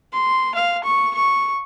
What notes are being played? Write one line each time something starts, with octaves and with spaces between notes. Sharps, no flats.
C6
F5
C#6
C#6